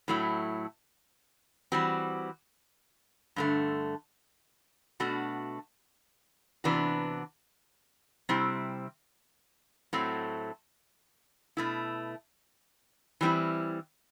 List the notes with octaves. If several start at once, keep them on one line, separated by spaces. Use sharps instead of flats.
A2 F#3 A3 E4
E3 G3 C4 F#4
G2 D3 A3
B2 A3 D4 F#4
C3 E3 B3 D4 F#4
C3 G3 C4 E4
A2 F#3 A3 C4
B2 A3 E4
E3 G3 C4 E4